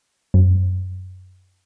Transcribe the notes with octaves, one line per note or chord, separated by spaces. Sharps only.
F#2